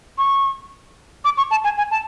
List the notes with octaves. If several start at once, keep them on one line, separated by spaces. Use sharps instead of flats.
C#6
D6
C#6
A5
G#5
G#5
A5